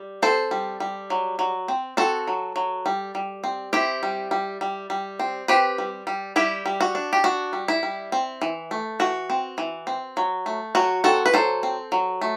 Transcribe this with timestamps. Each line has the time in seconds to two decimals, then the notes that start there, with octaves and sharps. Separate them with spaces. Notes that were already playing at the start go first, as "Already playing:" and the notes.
Already playing: G3
0.22 C4 A4 C5
0.51 G3
0.80 G3
1.10 F#3
1.39 F#3
1.68 C4
1.97 C4 F#4 A4
2.27 F#3
2.56 F#3
2.86 G3
3.15 G3
3.44 C4
3.73 C4 E4 G4
4.03 G3
4.31 G3
4.61 G3
4.90 G3
5.19 C4
5.48 C4 G4 B4
5.78 G3
6.07 G3
6.36 G3 E4 G4
6.66 G3
6.81 F#4
6.95 D4
7.13 G4
7.24 D4 F#4
7.53 G3
7.68 E4
7.83 G3
8.12 C4
8.42 E3
8.71 A3
9.00 E3 F#4
9.30 C4
9.58 E3
9.87 C4
10.17 F#3
10.46 A3
10.75 F#3 F#4
11.04 C4 F#4 A4
11.26 B4
11.34 F#3 A4 C5
11.63 C4
11.92 F#3
12.21 A3